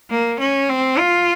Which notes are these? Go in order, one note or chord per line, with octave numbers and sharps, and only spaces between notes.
A#3
C#4
C4
F4